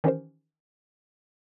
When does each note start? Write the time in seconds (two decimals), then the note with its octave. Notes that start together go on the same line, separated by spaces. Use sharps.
0.04 D#3 E3 C#4 G4 A#4 C5